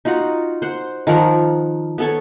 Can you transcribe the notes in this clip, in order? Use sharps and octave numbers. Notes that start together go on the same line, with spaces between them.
D#4 F4 F#4 F#5
C5 F#5
D#3 F3 A#4 F#5
B3 A4 C#5